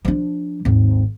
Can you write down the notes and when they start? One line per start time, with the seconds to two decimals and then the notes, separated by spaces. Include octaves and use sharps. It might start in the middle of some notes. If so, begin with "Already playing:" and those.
0.05 F3 D4
0.65 G#1 D#2